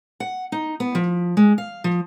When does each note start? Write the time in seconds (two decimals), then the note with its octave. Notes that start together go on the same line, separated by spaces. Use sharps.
0.20 F#5
0.52 D#4
0.80 B3
0.95 F3
1.37 G#3
1.58 F5
1.84 F3